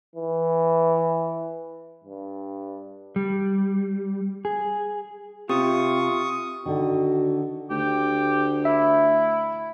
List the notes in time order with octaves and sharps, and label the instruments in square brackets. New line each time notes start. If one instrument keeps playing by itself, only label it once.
[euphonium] E3
G2
[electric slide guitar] G3
G#4
[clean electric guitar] C3 [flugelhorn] F4 [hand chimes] G4 [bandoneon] C#6 D#6
[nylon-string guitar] D3 D#3 [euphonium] F#4
[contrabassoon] D2 [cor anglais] G4
[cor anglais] E4 [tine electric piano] E5